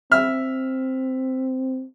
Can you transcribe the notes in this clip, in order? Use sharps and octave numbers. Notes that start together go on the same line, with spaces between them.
C4 E5 F6